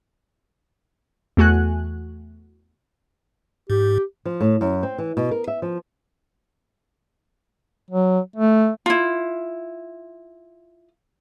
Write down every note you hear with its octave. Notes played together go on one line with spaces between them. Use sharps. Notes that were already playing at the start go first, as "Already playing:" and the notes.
E2 A3 F#4 G#5 F#6
G#2 G4
F3
A2
F#2
C4
E3
B2
A#4
E5
F3
F#3
A3
E4 F4